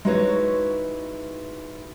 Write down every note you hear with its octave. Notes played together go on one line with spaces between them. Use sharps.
G#3 D#4 E4 F#4 B4 C#5